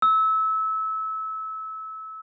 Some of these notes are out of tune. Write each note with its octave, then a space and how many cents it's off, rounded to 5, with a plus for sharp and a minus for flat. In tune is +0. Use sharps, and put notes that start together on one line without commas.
E6 -25